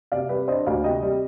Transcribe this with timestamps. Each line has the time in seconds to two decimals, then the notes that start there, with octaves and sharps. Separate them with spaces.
0.12 C3 D5 F5
0.29 G3 B4 D5
0.48 D4 C5 D#5
0.66 D2 D5 F5
0.84 C3 D#5 G5
1.02 G3